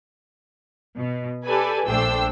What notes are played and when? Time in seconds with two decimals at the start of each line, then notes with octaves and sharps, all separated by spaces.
0.98 B2
1.46 G4 A4 B4 D5 G#5
1.86 A#1 A3 D4 C5 G5 E6